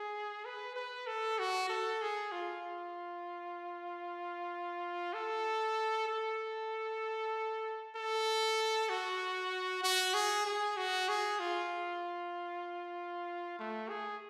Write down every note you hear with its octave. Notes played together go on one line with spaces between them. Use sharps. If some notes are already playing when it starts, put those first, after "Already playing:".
Already playing: G#4
B4
B4
A4
F#4
A4
G#4
F4
A4
A4
A4
F#4
F#4
G#4
G#4
F#4
G#4
F4
A3
G#4